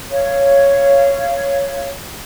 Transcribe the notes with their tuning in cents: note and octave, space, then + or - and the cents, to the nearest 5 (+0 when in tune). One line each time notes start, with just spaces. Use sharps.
C#5 +0 F5 -25